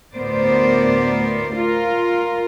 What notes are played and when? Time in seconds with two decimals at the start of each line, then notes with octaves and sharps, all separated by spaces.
0.15 D2 A2 B3 A#4 C5 D5
1.56 F4 A#4